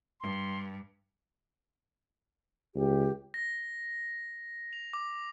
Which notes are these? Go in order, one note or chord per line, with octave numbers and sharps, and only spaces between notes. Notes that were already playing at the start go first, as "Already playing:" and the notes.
G2 C6
C#2 G4
A#6
F7
D6